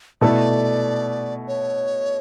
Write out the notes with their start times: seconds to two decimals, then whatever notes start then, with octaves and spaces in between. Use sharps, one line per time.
0.21 B2 A3 E4 A4 D5
1.48 C#5